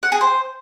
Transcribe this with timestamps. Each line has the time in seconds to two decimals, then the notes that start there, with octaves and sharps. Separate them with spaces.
0.03 F#5
0.12 G#4
0.21 C5